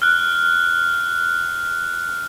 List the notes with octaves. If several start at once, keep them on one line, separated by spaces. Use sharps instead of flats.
F6 F#6